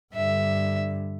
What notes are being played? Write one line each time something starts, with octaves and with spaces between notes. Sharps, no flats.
G2 D3 E5